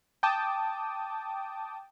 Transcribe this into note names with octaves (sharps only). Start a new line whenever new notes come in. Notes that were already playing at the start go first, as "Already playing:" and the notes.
G5 A5 D6 D#6